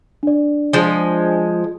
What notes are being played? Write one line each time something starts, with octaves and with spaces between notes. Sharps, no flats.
D4 D5
F3 G#3